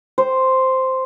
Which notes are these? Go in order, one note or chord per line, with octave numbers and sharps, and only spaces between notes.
C5